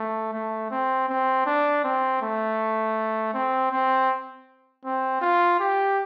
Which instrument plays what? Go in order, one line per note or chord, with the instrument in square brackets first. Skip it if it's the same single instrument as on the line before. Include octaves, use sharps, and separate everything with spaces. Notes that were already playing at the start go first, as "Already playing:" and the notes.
Already playing: [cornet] A3
A3
C4
C4
D4
C4
A3
C4
C4
C4
F4
G4